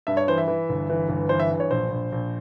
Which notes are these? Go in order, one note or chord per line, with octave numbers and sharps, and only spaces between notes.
G2 E5
C#5
E3 C5
E5
E3
G1
E3
G1
E3 C5
E5
G2
C#5
A#1 C5
A#1
A#1